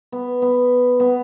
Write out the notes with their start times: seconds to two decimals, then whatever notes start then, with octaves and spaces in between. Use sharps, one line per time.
0.12 B3
0.42 B3
1.00 B3